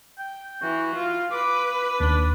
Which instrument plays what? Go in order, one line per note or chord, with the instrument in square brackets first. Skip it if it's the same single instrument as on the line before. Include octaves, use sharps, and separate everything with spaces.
[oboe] G5
[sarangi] E3 [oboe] F#4
[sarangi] F4
[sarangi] B4 [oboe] D6
[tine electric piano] D#2 [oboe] D4